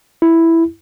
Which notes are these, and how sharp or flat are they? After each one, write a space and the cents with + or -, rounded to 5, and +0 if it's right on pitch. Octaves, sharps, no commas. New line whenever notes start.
E4 +0